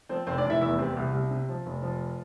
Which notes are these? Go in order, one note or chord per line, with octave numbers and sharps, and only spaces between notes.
F3 C4 C5
F1 C4 C5
D4 D5
F1 E4 E5
E2 E4 E5
C3 C4 C5
C2
C2
C3
F3
F1
F3